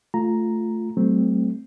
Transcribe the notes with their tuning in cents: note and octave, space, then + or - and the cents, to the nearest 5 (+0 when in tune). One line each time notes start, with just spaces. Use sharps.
A3 +0 F4 +0 A#5 +0
F#3 +40 A3 +0 C4 +0